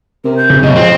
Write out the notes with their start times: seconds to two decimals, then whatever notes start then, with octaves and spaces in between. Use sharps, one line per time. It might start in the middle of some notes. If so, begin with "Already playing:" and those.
0.25 C3 A#4
0.37 G6
0.50 C#3
0.63 F#2 B2 D#5
0.76 F3 C4